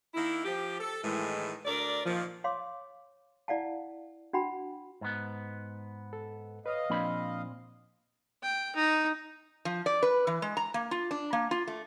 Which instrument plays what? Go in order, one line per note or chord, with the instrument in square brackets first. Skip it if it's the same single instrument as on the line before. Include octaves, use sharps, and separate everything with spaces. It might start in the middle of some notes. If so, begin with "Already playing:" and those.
[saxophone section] D#3 A#3 E4
F3 G4
A4
A2 D#3 E3 G#3
D2 D4 A#4 D5
A#2 D#3 F3
[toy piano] C#5 F5 C6 D6
E4 D5 F5 F#5 A5
D4 F#4 F#5 G5 B5
[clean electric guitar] G#2 B3
[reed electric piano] A4
[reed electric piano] B4 C#5 D#6 [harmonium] D#5 F5
[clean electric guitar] A#2 C4 B5 [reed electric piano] F3 A#3 D4
[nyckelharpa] G5
D#4
[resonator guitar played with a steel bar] F3
D5
B4
E3
G#3
A#5
A#3
F4
D4
A#3
F4
A3